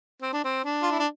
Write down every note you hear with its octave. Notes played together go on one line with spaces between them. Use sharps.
C4
D4
C4
D4
F4
E4
D4